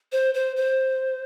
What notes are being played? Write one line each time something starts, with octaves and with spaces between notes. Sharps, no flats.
C5
C5
C5